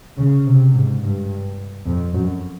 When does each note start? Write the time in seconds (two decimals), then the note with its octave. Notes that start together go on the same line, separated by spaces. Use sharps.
0.17 C#3
0.45 C3
0.74 G#2
1.02 G2
1.86 F2
2.15 F#2